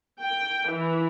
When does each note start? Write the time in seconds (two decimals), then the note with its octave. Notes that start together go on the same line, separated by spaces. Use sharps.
0.22 G5
0.70 E3